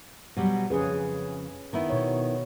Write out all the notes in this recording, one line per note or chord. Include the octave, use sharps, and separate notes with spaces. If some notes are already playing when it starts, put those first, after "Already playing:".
B2 F#3 G3
F2 C#3 C#4 G#4 B4
D#3 B3 E4
B2 C#5